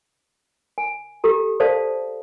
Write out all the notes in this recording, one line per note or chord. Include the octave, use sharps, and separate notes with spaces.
G#5
G4 A4 A#5
A4 C5 D5 F5 A5